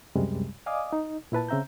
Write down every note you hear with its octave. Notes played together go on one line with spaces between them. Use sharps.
C#2 F#2 C3 G3 G#3
D5 D#5 F5 G#5 D6 D#6
D#4
A#2 E4 B4 A5
C#3 C4 E5 A#5 G6